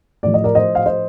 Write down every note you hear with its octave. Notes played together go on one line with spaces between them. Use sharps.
A2 F3 D5
D#5
A#4 D5
C5 D#5
F5
C5 D#5